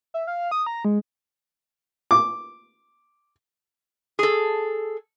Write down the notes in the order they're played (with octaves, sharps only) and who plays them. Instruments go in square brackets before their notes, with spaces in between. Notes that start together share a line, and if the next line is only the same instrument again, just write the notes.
[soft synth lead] E5
F5
D#6
A#5
G#3
[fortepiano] D6
[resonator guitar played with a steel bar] G#4 A4